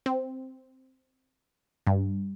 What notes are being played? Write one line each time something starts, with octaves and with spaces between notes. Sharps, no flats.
C4
G2